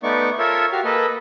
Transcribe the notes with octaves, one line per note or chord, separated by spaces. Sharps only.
A3 B3 D#4 D5 C#6
F4 A4 A#4 C#5 E5
F#4 G4 F5
A#3 A4 B4 D#5